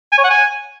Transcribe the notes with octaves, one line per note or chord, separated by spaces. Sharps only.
G#5
C#5
F#5
G#5